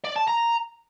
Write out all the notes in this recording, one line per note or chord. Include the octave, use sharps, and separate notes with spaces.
D5
A5
A#5